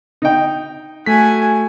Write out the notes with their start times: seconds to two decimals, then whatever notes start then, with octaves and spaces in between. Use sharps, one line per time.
0.22 D#4 G5
1.06 A3 F#4 G#5 B6